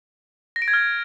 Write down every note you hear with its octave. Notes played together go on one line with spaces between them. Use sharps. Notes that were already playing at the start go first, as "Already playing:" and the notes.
A#6
D7
G#6
F6